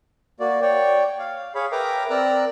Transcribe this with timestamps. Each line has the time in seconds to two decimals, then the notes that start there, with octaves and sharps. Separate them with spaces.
0.40 A#3 F#4 D5
0.62 C#5 D5 G5
1.19 F5
1.55 G#4 C#5 F5 B5
1.72 A#4 B4 E5 G5 A#5 D6
2.10 C4 A#4 D5 A#5 E6 F#6